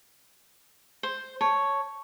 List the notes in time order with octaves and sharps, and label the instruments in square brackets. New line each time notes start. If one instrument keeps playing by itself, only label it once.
[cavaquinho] C5
[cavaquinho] C#5 [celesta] A5